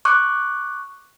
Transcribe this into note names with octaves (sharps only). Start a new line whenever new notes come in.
C#6 D6 F#6